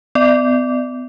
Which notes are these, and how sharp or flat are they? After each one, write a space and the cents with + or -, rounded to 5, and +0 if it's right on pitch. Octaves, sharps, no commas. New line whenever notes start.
B3 +35 D5 +25